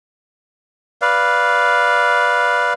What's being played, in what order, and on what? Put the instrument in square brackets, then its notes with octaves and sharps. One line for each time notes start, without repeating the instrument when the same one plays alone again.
[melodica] B4 D5 F5